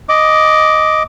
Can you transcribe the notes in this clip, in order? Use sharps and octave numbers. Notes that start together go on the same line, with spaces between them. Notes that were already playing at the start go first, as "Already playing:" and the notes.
D#5 D6